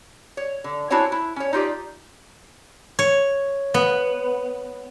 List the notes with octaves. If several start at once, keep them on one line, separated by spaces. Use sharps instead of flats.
C#5
D3
D4 E4 F#4 C5 C#5 G#5
E4
C#4 C#5
D#4 F4 G4 D5
C#5
B3